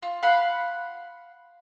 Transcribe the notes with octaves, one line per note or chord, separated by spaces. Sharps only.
F4
F5 F#5 B5 C6